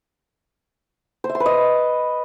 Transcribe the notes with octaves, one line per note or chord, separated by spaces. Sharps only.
C5
E5
C6
B4
D#5